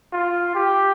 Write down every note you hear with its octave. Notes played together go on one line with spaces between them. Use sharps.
F4
G4